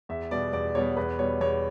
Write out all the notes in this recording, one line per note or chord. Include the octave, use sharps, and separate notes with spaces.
E2 E5
B2 G3 B3 D5
E2 D5
B2 G3 B3 C#5
E2 B4
B2 G3 C#5
E2 C#5